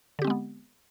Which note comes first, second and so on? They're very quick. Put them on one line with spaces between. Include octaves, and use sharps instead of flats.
D3 G4 C4 G#3 B3